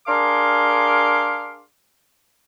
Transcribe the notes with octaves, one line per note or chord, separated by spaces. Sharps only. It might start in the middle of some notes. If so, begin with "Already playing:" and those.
D4 G#4 A#4 F5 C6 D6